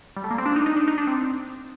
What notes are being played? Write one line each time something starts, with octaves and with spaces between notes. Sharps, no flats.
G3
A3
A#3
C4
D4
D#4
D#4
D4
D#4
D4
C4